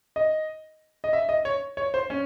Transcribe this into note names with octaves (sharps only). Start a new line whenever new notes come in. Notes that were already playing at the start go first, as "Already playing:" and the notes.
D#5
D#5
E5
D#5
C#5
C#5
C5
C#4